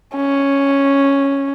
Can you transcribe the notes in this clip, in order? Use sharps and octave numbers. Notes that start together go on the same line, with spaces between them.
C#4